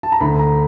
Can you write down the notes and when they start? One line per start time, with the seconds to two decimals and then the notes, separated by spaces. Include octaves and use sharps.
0.03 A5
0.12 A#5
0.20 D2 B5
0.39 A#5